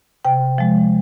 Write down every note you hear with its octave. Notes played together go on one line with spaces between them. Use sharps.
C3 G5
F3 G#3